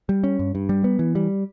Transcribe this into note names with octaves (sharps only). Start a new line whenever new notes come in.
G3
C#4
G2
G2
G3
B3
E3
G3